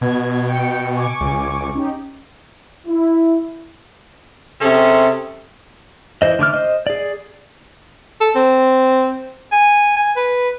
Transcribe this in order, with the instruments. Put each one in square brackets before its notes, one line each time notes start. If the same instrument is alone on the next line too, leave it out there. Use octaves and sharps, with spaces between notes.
[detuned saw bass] B2 [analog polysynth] B3 G#6
[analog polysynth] G5 C#7
G#5 C#6 D6
[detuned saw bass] C#2
[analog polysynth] C#4 D#4 G4
[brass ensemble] E4
[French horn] C3 [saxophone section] C#4 G#4 A4
[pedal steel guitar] E3 C5 D#5
D3 A3 D6 F6
C5 D#5
G#4 D5
[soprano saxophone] A4
C4
G#5
G#5
B4